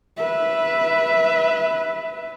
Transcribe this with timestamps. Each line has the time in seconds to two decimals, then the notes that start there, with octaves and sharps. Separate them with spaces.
0.17 B4 E5